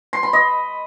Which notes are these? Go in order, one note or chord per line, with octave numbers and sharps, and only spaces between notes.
C6
B5
D#5